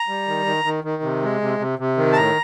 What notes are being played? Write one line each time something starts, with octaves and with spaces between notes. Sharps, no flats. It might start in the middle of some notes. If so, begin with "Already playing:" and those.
Already playing: A#5
G3
D#3
D#3
D#3
D#3
C3
G#3
C3
C3
C3
D#3
A5
A2 A#5